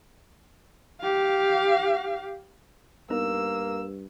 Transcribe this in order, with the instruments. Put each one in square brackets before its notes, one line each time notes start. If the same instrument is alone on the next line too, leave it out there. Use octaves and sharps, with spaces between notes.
[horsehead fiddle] G4 F5
[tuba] G2 [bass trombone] A#3 [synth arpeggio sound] B3 D#4 A#4 [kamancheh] E6